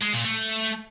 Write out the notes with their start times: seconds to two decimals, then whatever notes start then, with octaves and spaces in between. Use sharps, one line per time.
0.02 G#3
0.14 A#2
0.25 A3